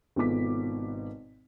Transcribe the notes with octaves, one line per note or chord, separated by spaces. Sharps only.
G#1 B2 F4 A4 D6 B6